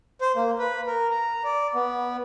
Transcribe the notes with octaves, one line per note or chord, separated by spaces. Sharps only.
C5
A#3
B4
A#4
A#5
D5
B3